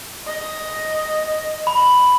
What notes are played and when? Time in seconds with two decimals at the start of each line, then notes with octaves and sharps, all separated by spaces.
0.27 D#5
1.67 B5